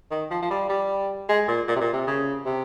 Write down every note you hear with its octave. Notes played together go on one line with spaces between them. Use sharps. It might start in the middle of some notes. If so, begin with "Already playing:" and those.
D#3
F3
F3
G3
G3
G#3
A#2
A#2
C3
A#2
C3
C#3
C3